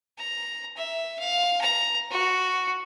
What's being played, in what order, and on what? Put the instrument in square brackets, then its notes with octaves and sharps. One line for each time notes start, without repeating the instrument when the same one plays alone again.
[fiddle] A#5
E5
F5
A#5
F#4